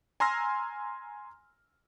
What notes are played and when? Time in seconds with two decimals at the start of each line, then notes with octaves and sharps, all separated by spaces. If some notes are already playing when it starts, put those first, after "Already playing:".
0.20 G#5 A#5 C6 E6 F6 A#6